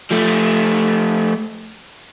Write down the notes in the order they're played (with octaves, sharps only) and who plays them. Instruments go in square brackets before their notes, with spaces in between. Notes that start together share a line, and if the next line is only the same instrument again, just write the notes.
[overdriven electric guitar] F3 A3